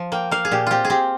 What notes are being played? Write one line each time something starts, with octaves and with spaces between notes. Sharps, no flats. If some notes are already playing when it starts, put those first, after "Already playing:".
Already playing: F3
A#3 G5
A#3 F5
G#4
A#2 G4
C4 F4 G4
G#4
C4 G4